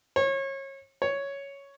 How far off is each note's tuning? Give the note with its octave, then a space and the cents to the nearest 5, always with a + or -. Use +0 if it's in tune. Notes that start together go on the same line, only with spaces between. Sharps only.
C#5 -30
C#5 +5